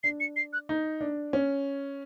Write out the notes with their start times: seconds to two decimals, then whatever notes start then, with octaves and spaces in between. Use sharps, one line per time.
0.04 D4 C7
0.20 C#7
0.36 C7
0.53 F#6
0.69 D#4
1.01 D4
1.33 C#4